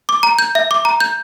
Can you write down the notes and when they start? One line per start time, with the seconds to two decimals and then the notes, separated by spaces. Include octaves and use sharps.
0.09 D6
0.23 A#5
0.39 G6
0.55 E5
0.71 D6
0.85 A#5
1.00 G6